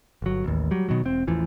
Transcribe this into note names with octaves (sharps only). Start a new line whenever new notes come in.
G1 F#3
A1 D#2
F#3 G3
B2 D#3 F#3
E1 C4
A1 E2 E3 F3